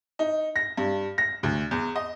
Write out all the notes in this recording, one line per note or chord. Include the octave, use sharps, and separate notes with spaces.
D#4
A#6
G2
A#6
D2
E2
D#5